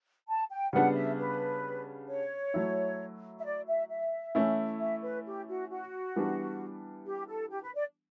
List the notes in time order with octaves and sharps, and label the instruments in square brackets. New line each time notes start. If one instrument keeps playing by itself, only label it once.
[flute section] A5
G5
[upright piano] C#3 G3 B3 D4 [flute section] F#5
[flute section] E5
B4
C#5
[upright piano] F#3 A3 E4
[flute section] E5
D5
E5
E5
[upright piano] E3 A3 C#4 E4
[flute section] E5
B4
G4
F#4
F#4
[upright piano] E3 G3 B3 D4
[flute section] G4
A4
G4
B4
D5